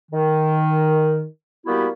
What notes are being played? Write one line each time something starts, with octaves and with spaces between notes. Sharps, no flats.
D#3
G3 A#3 B3 E4 F#4 G4